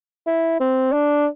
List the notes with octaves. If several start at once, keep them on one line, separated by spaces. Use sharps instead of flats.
E4
C4
D4